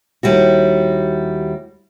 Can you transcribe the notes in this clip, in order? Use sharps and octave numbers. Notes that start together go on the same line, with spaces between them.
D#2 G3 E4 F#4